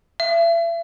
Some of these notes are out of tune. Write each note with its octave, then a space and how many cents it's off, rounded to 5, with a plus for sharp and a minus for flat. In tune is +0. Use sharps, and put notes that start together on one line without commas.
E5 +35